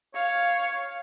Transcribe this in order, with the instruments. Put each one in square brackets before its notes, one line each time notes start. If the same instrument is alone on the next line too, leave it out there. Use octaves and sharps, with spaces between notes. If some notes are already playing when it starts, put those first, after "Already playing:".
[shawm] C#5 [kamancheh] F5